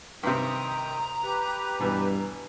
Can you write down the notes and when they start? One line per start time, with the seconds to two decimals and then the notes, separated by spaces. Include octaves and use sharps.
0.23 G2 C3 D#3 G5 A#5 D#6
1.23 G4 B4
1.80 G2 B2 E3